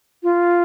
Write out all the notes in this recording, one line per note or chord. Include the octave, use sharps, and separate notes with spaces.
F4